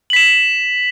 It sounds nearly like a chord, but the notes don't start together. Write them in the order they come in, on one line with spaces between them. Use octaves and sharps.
F#7 B6 E7